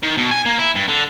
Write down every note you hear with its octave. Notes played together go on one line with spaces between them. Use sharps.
D#3
B2
G#5
A#3
E4
G2
D3